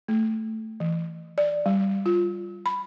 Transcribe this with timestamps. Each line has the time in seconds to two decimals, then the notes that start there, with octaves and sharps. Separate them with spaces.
0.08 A3
0.80 E3
1.38 D5
1.66 G3
2.06 F4
2.66 B5